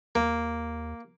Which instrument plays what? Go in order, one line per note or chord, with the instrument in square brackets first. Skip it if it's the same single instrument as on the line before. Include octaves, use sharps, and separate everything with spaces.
[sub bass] D#2 [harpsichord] A#3